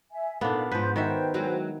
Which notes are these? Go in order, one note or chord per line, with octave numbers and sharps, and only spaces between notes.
E5 G#5
A#2 B3 D4 D#4 A4 F5
G#2 F3 B4 C5 C6 G6
D#3 F#4 B4 C5 E5 G5
F#3 G#3 E4